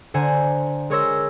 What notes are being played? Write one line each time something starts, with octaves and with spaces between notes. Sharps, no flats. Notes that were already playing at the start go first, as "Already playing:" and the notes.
D3 C5 F#5 G#5 A#5 E7
G#3 A#4 C#5 C6 E6 A#6